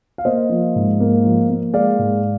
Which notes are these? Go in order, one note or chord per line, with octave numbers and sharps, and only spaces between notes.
F5
A#3 C5 D#5
F3
G#2
A#3
F3
A#3
G#3 D5 F5
G#2